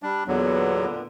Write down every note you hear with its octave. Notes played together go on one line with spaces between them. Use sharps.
G3 D4
E2 A#2 D3 F#3 B3